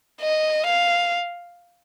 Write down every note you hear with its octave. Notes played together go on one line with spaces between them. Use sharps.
D#5
F5